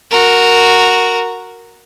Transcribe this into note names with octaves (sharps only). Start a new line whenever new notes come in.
F#4 A#4